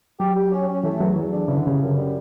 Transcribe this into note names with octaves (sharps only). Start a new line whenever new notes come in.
F#3 G4
G4
C#4
C#4
E3 A3
E2 F#3
E2 E3
D4
C#3 E3
D3
C#3 G3
F#2
G3